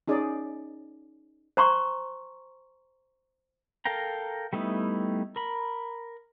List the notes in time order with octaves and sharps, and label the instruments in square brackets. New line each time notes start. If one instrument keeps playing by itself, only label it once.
[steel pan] C#4 D#4 G#4 D5
[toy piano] C5 A#5 C6 C#6
[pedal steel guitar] A4 A#4 F5 G5 A#5
G3 A3 B3 D#4 E4
A#4 B5